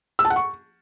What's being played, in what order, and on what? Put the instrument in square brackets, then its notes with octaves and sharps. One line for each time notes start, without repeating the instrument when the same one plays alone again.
[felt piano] E6
A5
F#5
C#6